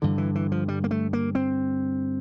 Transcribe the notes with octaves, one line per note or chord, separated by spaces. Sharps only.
G2 D3 E3
E3
E3
F3
G3
A#3
A3
A#3
C4